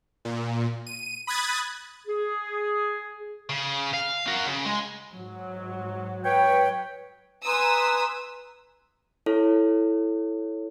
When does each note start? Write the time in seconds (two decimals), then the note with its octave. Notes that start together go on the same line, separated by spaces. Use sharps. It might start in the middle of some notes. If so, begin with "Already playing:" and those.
0.25 A#2
0.86 D#7
1.27 B5 D#6 F#6 G#6 A6
2.07 G#4
3.50 C#3
3.93 F5
4.27 F#4 A#4
4.46 C#3
4.66 G#3
5.15 G#2 F#3
6.24 B4 C#5 G5
7.45 B4 G#5 A#5 C6 D#6 E6
9.26 E4 A4 C#5